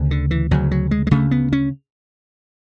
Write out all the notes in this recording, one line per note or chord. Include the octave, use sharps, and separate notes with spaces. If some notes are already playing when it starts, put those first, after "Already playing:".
Already playing: D2 C#3
D3
E3
D2 C#3 F#3
F#3
G#3
G#3
D2 C#3 A3
B3
C#4